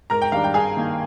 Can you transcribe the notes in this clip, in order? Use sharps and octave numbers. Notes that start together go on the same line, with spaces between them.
G#2 A#4 A#5
G5
D#3 G3 D4 F5
G5
G2 G#4 G#5
D#3 A#3